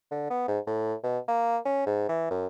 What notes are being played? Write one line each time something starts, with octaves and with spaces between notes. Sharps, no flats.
D3
B3
G#2
A2
B2
A#3
C#4
G#2
E3
F#2